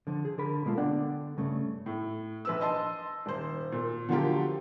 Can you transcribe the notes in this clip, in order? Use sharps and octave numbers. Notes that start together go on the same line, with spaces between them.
D3 F3
G#4
D3 A#4 B5
B2 G#3 A#3 F4 G4 A4
D3 B3 D4 D5 F#5 G5
G2 C#3 A3
A2
A#1 B4 E6
D#5 A5 C6
D#1 C5
A#2
D3 F3 F#3 A#3 F4 G4